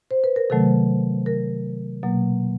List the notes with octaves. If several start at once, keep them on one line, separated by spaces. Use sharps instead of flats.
C5
B4
A#4
C3 D#3 F#3 A3 A4
A#4
B2 F#3 A#3